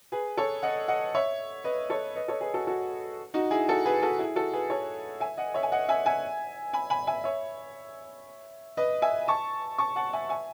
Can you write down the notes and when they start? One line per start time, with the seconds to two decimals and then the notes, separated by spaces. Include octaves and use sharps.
0.12 G#4 B4
0.37 A4 C#5
0.63 D#5 F#5
0.88 D#5 F#5
1.15 C#5 E5
1.64 B4 D#5
1.90 A4 C#5
2.15 B4 D#5
2.28 A4 C#5
2.41 G#4 B4
2.54 F#4 A4
2.67 F#4 A4
3.34 D#4 F#4
3.51 E4 G#4
3.68 F#4 A4
3.86 G#4 B4
4.02 F#4 A4
4.19 E4 G#4
4.36 F#4 A4
4.53 G#4 B4
4.70 A4 C#5
5.20 E5 G#5
5.37 D#5 F#5
5.54 C#5 E5
5.63 G#5
5.72 D#5 F#5
5.89 E5 G#5
6.06 E5 G#5
6.73 G#5 B5
6.90 G#5 B5
7.07 E5 G#5
7.24 C#5 E5
8.77 B4 D#5
9.02 E5 G#5
9.28 A5 C#6
9.78 A5 C#6
9.96 F#5 A5
10.13 E5 G#5
10.29 E5 G#5